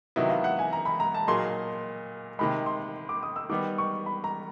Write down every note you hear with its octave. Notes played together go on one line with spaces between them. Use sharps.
C3 D#3 F#3 B3 E4 D#5
F5
F#5
G#5
A#5
B5
A#5
A5
A#2 F#3 A#3 D#4 G#4 C6
C3 D#3 G#3 B5
C6
D6
D#6
E6
D#3 G3 B3 D6
C#6
B5
A#5